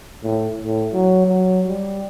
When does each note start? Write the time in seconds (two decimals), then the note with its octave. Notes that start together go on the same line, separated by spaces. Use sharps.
0.24 A2
0.62 A2
0.93 F#3
1.26 F#3
1.68 G3